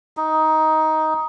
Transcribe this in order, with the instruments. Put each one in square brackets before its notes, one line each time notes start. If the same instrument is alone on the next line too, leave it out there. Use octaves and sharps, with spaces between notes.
[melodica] D#4